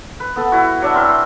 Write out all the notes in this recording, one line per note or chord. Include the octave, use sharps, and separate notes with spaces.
B4
B3 A4
E4 F#4
F#3 D4 E5
C4 A#4 E5
C5